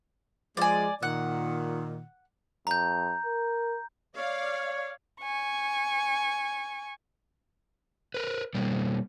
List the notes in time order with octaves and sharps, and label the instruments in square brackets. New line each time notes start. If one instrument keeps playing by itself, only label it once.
[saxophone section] F3 G#3 [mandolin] D5 G#5
[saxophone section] A#2 D#3 [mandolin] F#5
[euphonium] F2 [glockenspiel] A#5 G6
[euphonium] A#4
[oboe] C#5 [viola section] D5 F5
[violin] G#5 C#6
[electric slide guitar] A#4 B4
B2 G3 A#3